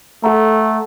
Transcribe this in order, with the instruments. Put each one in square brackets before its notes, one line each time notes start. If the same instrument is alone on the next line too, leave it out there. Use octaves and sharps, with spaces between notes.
[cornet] A3 [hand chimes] A4 F#5 A#5